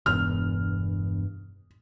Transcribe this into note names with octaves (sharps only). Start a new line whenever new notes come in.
E1 E2 G2 F6